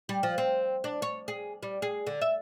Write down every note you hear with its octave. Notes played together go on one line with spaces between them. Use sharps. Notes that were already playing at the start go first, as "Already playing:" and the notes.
G3
F3
C4
D4
C#5
G#4
G3
G#4
D3
E5